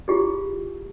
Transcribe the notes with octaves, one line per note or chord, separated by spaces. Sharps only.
E4 F4 G4 G#4